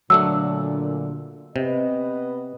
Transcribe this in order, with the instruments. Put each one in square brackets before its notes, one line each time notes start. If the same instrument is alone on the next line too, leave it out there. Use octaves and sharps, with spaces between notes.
[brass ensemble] A#2 D3 [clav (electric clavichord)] F#3 A3 D4 [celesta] E6
[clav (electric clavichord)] C3 [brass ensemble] B3 B4 D#5